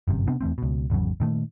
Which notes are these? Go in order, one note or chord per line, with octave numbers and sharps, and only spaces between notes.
G1 F#2 C3
C3 B3 C4 D4
E2 E3 A3 C4
C#2 B2
G#1 E2 C#3 F#3
A#2 D#3 A3